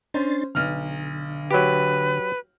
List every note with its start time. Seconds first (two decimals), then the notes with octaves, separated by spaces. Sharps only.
0.14 C#4 D4 C5 C6 A6
0.55 B1 D3 F6
1.51 F#3 G4 B4